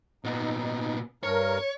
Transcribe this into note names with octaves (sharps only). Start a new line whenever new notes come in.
A#2 B3 D#4
G2 A#4 C#5